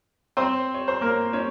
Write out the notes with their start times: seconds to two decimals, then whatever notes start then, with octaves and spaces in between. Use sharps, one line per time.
0.37 C4 C5
0.74 C#5
0.88 C5
1.01 A#3 A#4
1.33 C#4 C#5